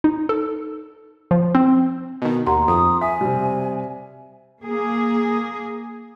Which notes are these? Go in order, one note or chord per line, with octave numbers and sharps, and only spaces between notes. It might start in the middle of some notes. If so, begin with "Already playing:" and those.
D#4
A4
F3
C4
B2 D#3
D#2 F#5 A#5 C6
F2 D#6
E5 G#5 B6
C3 G3
A#3 G#4